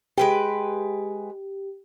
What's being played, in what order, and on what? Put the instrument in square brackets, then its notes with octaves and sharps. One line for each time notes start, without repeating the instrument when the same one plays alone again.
[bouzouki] G#3 B4 G5 [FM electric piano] G4